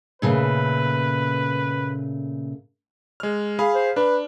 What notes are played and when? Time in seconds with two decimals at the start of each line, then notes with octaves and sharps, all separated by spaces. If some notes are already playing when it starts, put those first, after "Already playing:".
0.22 A#2 C#3 A3 B4
3.20 G#3 F6
3.59 G#4 F5 B5
3.75 C5
3.96 D4 B4